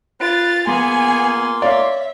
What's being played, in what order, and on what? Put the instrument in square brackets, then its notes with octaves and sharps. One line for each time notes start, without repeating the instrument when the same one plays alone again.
[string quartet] F4 A6 [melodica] B4
[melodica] A#3 F4 C6 [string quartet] B3 G#4 G#5
[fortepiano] C#5 D5 F5 [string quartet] E5